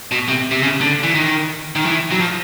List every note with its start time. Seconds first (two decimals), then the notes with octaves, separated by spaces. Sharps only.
0.11 B2
0.29 C3
0.51 C3
0.63 C#3
0.81 D3
1.03 E3
1.15 D#3
1.75 D#3
1.85 E3
2.11 F#3
2.20 F3